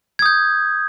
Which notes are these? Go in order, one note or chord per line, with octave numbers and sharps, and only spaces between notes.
D#6 G6 G#6